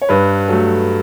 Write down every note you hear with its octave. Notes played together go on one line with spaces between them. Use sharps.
C#5
G2 B4
F#3 A3 A4